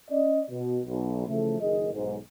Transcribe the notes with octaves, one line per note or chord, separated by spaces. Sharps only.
C#4 D5 D#5
B2
B1
C#3 E3 F3 A3
F#1 D#3 G#4 D#5
B1 G#2